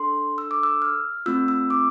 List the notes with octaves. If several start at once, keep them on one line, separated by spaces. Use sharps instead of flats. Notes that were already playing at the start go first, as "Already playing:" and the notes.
Already playing: D4 A4 C6
E6
D6
E6
F6
A3 C4 F4 E6
E6
D6